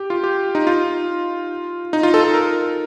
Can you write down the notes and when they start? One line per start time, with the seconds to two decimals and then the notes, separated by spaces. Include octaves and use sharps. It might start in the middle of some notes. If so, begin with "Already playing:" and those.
Already playing: G4
0.10 F4
0.23 G4
0.55 D#4
0.67 F4
1.93 D#4
2.03 F4
2.14 A4
2.24 A4
2.34 A#4